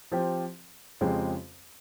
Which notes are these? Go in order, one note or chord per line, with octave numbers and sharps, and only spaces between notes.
F3 C4 G4
F2 C#3 G#3 C4 G4